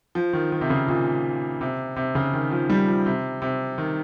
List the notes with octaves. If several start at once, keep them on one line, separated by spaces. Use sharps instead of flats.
F3
D#3
D#3
C3
C#3
A#2
C3
C3
C#3
D#3
F3
G3
F3
C3
C3
D#3